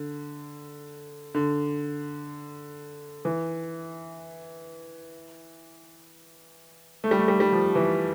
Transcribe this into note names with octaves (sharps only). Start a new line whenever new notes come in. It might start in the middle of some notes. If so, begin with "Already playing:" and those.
Already playing: D3
D3
E3
A3
G3
A3
G3
G3
F3
E3